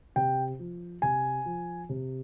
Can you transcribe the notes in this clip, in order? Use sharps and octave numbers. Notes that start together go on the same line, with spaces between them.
C3 G5
F3
C3 G#5
F3
C3